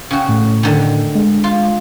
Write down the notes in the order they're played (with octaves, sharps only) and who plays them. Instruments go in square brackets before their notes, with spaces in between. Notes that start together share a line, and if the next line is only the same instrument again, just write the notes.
[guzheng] C#3 F#4 [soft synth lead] G5
[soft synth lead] A2
[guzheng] D3 D#3
[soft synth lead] G#3
[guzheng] F4